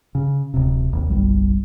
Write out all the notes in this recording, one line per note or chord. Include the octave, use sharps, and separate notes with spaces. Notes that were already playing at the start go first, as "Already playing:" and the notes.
C#3
D1 C3
G#1 D#2
F#1 B1 G3